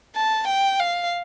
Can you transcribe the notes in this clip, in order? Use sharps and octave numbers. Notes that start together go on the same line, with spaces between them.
A5
G5
F5